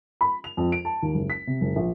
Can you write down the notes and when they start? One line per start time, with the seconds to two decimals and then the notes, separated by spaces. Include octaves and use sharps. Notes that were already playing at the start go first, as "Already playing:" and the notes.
0.21 B5
0.44 F7
0.57 F2
0.72 D7
0.85 A5
1.03 D#2
1.15 F#1
1.30 B6
1.47 C3
1.61 F#1
1.76 A#1